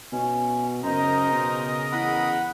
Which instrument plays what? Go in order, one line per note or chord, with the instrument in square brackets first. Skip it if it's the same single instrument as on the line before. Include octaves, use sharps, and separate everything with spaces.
[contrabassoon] B2 [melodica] C#4
[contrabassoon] F#2 [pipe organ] C#3 A#4 D#5 [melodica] D#4 C5 A#5
[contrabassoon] B2
[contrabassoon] E2 [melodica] F#5 B5